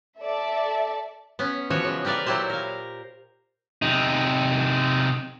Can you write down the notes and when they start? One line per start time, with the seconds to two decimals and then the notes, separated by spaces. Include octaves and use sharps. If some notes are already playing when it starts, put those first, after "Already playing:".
0.22 A4 D5 E5 A5
1.39 B3 C#4
1.70 E3 F3 F#4 C#5
1.84 C#3 G#3
2.05 G4 A#4 B4 D5 F5
2.26 A#2 F#3 E4 G4 C5
2.50 A#4 F5
3.82 C3 D#4